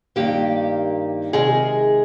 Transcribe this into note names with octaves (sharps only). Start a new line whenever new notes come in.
G2 D#3 A#3 G4
C3 D#3 G#3 G#4